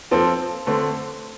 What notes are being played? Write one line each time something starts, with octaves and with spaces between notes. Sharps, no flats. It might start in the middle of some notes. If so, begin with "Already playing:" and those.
F3 C4 A4
D3 A3 C4 A4